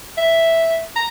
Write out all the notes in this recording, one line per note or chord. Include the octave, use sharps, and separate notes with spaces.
E5
A#5